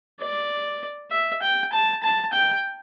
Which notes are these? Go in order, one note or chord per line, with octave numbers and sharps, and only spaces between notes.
D5
E5
G5
A5
A5
G5